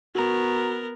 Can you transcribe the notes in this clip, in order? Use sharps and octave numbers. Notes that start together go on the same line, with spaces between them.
B3 F#4 A#4 A#5